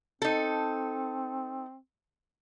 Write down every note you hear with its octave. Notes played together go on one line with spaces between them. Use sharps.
C4 D#4 A4